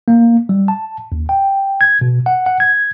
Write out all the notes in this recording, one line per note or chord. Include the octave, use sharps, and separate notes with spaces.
A#3
G3
A5
D#2
G5
G#6
B2
F#5
F#5
G#6